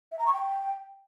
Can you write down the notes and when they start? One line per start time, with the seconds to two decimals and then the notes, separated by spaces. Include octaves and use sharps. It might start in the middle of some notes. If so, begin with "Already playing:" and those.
0.12 E5
0.19 A#5
0.26 C#6
0.33 G5